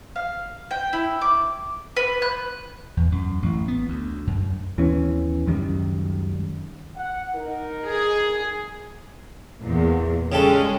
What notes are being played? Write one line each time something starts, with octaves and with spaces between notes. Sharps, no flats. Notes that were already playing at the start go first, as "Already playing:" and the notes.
F5
G5
E4
D6
B4
F#6
E2
F#2
A1
B3
D2
F#2
D#2 E3 B3 C#4
C#2 F#2 D#3 G3
F#5
D#4 A#4
G#4
E2 A#2
C#3 G3 G#3 C#4 A4